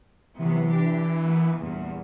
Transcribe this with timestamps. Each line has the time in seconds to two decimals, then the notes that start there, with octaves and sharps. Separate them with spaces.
0.39 C3 E3 F#3 B3
0.70 D4 G4
1.22 A#3 B3
1.59 E2 G2 A#2